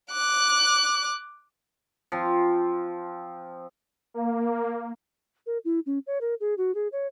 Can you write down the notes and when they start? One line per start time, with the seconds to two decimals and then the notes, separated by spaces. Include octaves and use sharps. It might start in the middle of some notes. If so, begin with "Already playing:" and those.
0.12 D6 F#6
2.12 F3 C4
4.14 A#3
5.46 A#4
5.65 E4
5.86 C#4
6.07 C#5
6.21 A#4
6.40 G#4
6.58 F#4
6.75 G#4
6.92 C#5